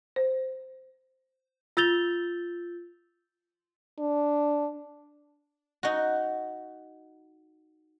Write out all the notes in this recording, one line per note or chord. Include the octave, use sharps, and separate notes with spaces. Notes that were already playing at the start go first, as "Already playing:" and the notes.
C5
F4 E6 G6 A6 F7 G7
D4
D#4 F#4